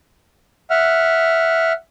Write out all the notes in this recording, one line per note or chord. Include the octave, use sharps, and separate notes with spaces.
E5 F#5 F6